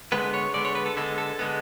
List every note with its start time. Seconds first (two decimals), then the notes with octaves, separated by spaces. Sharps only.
0.12 D3 G#3 B3 B4
0.34 C#5
0.54 D3 G#3 B3 D5
0.65 C#5
0.75 B4
0.86 A4
0.96 D3 G#3 B3 A4
1.18 A4
1.39 D3 G#3 B3